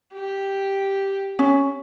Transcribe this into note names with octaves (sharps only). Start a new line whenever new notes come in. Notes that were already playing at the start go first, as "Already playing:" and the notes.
G4
C#4